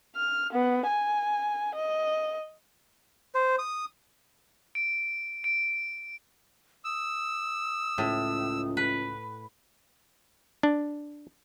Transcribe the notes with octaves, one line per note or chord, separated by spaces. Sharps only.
F6
B3
G#5
D#5
C5
D#6
D7
D7
D#6 E6
C#2 A2
B4
D4